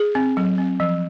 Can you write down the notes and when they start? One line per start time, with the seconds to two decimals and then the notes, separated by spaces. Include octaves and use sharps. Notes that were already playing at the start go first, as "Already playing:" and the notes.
Already playing: G#4
0.15 C4
0.37 F#3
0.58 C4
0.80 F3